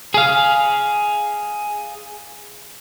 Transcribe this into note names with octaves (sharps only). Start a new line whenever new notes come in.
G#4 F5